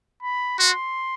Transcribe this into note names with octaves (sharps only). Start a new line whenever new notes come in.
B5
F#4 C6